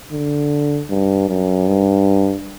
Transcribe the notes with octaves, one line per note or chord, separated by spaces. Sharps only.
D3
G2
F#2
G2